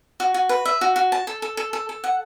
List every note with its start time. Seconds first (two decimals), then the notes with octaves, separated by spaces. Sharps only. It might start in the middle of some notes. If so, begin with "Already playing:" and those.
0.20 F#4
0.34 F#4
0.49 B4
0.65 E5
0.81 F#4
0.96 F#4
1.12 A5
1.27 A4
1.42 A4
1.57 A4
1.73 A4
1.89 A4
2.04 F#5